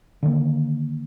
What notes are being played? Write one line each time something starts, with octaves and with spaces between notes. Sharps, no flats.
D3 D#3 G3 A#3